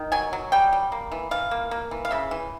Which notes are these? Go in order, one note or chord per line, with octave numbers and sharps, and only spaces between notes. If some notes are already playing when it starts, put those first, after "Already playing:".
Already playing: D#3
F#3 G#5
F#3
G3 G5
G3
A#3
E3
E3 F5
A#3
A#3
E3
F5
C#3 E5
E3